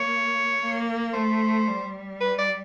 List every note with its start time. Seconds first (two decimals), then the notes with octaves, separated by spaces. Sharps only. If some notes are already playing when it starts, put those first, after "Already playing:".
Already playing: A#3 C#5
0.61 A#3
1.14 A3 C5
1.67 G3
2.21 B4
2.38 D5